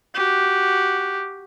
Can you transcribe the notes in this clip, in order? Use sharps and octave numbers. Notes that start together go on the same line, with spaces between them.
F#4 G4